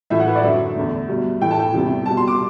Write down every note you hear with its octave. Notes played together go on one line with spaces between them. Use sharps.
A2 E3 A3 E5
F#5
B4
D5
F#2 D3 F#3 E5
E2 D3 A3
B2 G3
A2 E3 A3 G5
A5
G5
E2 C3 E3 G3
B2 G3 A5
C6
D6